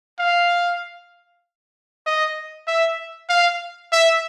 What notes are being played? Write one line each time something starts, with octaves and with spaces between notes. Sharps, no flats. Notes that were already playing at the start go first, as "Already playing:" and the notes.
F5
D#5
E5
F5
E5